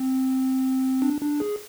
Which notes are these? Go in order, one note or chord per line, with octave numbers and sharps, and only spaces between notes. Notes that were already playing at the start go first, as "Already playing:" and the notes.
Already playing: C4
D4
D4
G#4